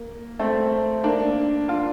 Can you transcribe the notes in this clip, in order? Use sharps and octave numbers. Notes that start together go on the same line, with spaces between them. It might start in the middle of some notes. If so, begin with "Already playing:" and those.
Already playing: A#3
A3 C4
A#3 D4
D4 F4